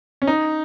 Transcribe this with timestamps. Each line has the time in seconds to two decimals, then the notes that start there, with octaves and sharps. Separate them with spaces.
0.22 C#4
0.27 D#4